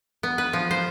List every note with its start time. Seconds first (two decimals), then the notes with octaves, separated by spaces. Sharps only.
0.23 B3
0.38 B4
0.53 F3
0.71 C5